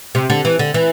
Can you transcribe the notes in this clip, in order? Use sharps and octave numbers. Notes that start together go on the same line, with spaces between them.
C3
D3
E3
D3
E3